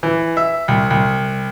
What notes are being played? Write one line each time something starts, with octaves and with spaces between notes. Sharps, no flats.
E3
E5
C2
C2